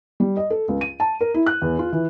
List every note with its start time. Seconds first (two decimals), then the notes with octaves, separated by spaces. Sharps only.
0.20 G3
0.37 D#5
0.50 A4
0.68 C#2
0.81 D#7
1.00 A5
1.21 A#4
1.34 E4
1.46 F#6
1.62 E2
1.79 F4
1.92 E3